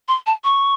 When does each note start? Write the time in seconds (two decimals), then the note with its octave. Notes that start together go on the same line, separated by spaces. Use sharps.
0.08 C6
0.26 A5
0.44 C#6